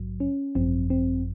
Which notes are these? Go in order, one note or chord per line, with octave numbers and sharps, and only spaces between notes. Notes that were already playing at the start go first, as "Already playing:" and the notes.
Already playing: A#1 G#2 F#3
C#4
G#1 F#2 F3 C4
C4